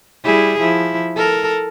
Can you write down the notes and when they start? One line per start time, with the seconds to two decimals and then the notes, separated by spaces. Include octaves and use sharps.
0.25 G3 E4 G#4
0.60 F3 E4
1.17 A4 A#4